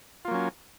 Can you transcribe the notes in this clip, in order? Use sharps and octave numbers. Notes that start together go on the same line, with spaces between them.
F#3 A#3 C#4 F4